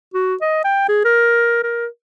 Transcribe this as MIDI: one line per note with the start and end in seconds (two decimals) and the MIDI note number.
0.14 0.35 66
0.41 0.63 75
0.64 0.85 79
0.89 1.02 68
1.05 1.58 70
1.63 1.86 70